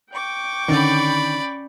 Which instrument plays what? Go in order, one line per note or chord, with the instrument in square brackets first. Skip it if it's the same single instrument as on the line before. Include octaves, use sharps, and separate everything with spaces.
[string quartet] G5 C#6 D6
[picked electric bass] D3 D#3 [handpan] C#4 [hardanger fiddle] D5 B5